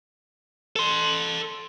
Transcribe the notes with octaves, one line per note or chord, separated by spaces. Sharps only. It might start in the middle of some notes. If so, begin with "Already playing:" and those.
A4 C6